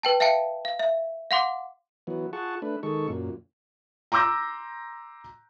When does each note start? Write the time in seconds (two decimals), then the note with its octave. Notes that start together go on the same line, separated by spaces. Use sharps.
0.03 B4 G5 A5
0.20 E5 F5 G5 A5 C#7
0.65 F5
0.79 E5
1.31 F5 F#5 C6 D6
2.07 E3 F#3 B3
2.33 F4 G#4 F#5 A5 C#6
2.62 A3 D4 B4
2.83 D#3 G#3 A4 C#6
3.08 F#2 A#2
4.12 A#5 C6 D6 E6 G6 A#6